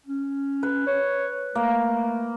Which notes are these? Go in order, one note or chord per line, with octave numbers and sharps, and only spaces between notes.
C#4
B4
C#5
A3 A#3